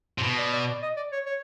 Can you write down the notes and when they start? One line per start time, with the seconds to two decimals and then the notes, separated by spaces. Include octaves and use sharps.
0.18 C3
0.23 B2
0.39 D5
0.53 D5
0.68 D5
0.83 D#5
0.97 D5
1.12 C#5
1.25 C#5